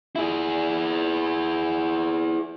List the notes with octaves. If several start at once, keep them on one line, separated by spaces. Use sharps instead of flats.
E4 G#4